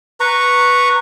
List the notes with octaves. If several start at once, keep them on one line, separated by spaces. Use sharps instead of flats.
B4 A#5 C#6